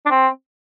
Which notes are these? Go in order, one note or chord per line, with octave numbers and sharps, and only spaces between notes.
D4
C4